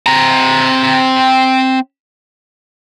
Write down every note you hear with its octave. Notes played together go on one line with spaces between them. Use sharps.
C4 A#5